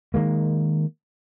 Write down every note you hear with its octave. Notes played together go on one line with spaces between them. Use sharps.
D#3 G#3 A#3